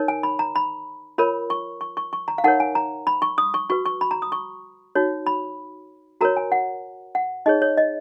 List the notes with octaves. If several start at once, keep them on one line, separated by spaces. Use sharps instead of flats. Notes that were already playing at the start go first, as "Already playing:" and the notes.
Already playing: D#4 A#4 C#5
G#5
B5
A#5
B5
F4 A#4 C#5 B5
C#6
C#6
C#6
C#6
A#5
F5
D#4 A#4 C#5 F#5
G#5
A#5
B5
C#6
D#6
C#6
F#4 B4 C#6
C#6
B5
A#5
D#6
C#6
D#4 F#4 C#5
B5
F#4 A#4 C#5 A#5
G#5
F#5
F#5
D#4 G#4 C#5 D#5
C#5
D#5